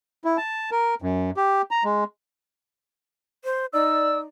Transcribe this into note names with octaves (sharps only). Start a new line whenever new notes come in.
E4
A5
A#4
F#2
G4
A#5
G#3
C5
D#4 D5 E6